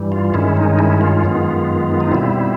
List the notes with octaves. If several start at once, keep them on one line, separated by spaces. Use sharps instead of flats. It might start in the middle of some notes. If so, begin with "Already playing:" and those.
Already playing: G2 E3 G3
F4
G2 D#3 G#3 C#4 E4
D#4
E4
F4
F#2 D#3 G#3 B3
D#4
B2 G3 C4 E4